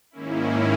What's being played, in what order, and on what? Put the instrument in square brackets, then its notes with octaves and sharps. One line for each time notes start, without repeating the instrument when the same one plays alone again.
[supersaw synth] G#2 D#3 A#3 C#4 E4